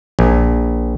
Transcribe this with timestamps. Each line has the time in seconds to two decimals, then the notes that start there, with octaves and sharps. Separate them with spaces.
0.19 A#1